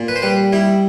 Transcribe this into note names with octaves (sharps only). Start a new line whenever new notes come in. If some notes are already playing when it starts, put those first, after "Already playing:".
Already playing: A#2
B4
C5
G3 B4
G3 E4